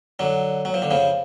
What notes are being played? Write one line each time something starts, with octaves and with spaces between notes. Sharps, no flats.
D3 F#3
F#3
F3
D3
C#3 F3